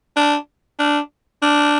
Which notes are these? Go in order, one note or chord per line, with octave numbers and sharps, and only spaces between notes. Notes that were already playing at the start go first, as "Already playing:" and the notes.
D4
D4
D4